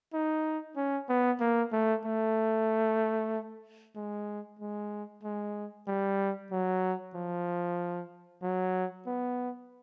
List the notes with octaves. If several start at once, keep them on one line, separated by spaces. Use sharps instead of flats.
D#4
C#4
B3
A#3
A3
A3
G#3
G#3
G#3
G3
F#3
F3
F#3
B3